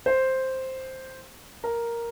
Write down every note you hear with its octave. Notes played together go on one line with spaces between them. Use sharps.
C5
A#4